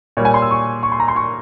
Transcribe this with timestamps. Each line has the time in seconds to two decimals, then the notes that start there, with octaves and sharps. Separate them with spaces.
0.17 A#2 G3 C#5
0.25 G#5
0.34 C6
0.42 E6
0.51 C#6
0.83 C#6
0.92 C6
1.00 A#5
1.08 C6
1.16 C#6